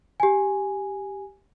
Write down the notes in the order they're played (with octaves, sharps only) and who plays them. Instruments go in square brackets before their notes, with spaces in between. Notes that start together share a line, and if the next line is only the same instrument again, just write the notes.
[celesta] G4 G#5